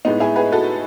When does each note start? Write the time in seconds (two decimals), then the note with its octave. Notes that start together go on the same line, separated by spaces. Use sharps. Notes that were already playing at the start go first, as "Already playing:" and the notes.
0.05 A2 G#3 B3 D#4
0.20 E4 G#4
0.36 G#4 B4
0.52 F#4 A4